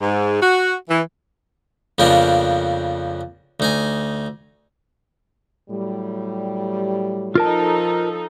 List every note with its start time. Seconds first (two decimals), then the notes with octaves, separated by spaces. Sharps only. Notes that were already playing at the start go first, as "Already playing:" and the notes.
0.01 G#2
0.41 F#4
0.89 E3
1.98 F2 C#3 F3 A#3 B3 D4
3.60 D2 D#4 G#5
5.70 A2 F#3 G3
7.35 F3 D#4 F4 A4 A#4 A5